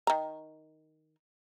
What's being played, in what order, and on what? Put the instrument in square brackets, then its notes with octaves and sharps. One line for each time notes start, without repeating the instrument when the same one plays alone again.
[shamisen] D#3 A#5